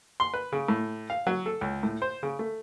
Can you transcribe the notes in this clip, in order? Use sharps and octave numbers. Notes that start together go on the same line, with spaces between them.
C6
B4
C#3
A2
F5
F#3
A4
C#2
A2
C5
C#3
A3